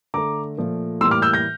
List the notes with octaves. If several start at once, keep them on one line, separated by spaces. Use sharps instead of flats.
D3 A3 A#5 D6
A#2 F3 A3
A2 E3 G3 A#3 C6 E6
D6 F6
E6 G6
G6 A#6